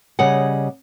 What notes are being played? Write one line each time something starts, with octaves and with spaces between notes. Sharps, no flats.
C#3 G3 G#4 D#5 F#5